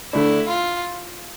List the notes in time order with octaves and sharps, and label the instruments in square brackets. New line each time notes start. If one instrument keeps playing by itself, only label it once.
[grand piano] D3 A3 D4 [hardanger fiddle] E4
[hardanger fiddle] F4